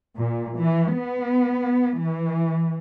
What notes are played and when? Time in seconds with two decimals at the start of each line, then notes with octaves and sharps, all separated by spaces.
0.17 A#2
0.57 E3
0.93 B3
1.98 E3